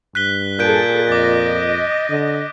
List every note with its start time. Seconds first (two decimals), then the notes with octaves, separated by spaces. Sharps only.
0.15 G2 F#6 B6 G7
0.59 A#2 G#4 A4 F#6 G6 D7
1.09 F2 D#5 D6 A6
2.10 D3